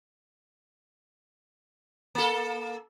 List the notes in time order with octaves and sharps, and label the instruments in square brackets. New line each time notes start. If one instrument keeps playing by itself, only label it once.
[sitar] A#3 A4